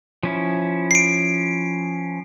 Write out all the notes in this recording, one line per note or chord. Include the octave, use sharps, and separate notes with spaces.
F3 C#4 E4
C7 D7